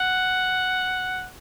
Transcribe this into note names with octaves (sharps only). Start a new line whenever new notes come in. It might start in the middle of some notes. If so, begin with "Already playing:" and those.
Already playing: F#5